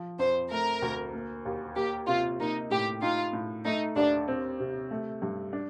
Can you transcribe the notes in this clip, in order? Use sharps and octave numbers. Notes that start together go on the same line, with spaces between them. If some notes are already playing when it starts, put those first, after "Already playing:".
Already playing: F3
F2 C5
A3 A#4
D2
A#3
D#2
A#3 G4
C3 F4
A#3 D#4
A2 G4
D#4 F4
A2
A3 D#4
D#2 D4
C4
C3
A3
G2
D4